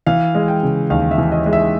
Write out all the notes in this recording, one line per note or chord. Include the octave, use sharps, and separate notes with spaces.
E3 F5
G#3
G5
C#3
D#2 F5
E5
E3
D#5
G#3
E5